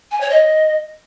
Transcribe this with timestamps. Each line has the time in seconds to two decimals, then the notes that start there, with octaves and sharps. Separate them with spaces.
0.11 G#5
0.21 C#5
0.30 D#5